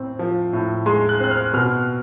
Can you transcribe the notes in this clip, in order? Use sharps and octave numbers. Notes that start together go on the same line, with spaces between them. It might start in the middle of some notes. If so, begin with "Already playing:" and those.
Already playing: A2 C4
F3
A2
G#3 C6
F#6
C4 F#6
F6
B2 F6